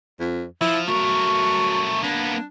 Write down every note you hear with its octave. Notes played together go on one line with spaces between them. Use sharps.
F2
F3 E4
F#3 A3 A#4 C#6
A#3 B3 D4